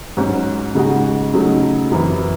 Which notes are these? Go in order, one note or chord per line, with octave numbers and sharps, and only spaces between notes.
G#2 F#3 C#4 F#4
C#3 G#3 D#4 F#4
C#3 F#3 A3 D#4
F#2 E3 C4 E4